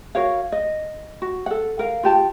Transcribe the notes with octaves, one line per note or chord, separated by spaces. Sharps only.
F#4 A#4 C#5 F5
D#5
F#4
A4 F#5
A#4 F5
F4 G4 A5